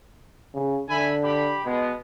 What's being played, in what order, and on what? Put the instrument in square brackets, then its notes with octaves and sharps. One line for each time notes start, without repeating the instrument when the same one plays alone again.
[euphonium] C#3
[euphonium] D3 [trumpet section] E5 G#5 B5
[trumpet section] G4 B5
[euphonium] B2 [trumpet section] G#3 B3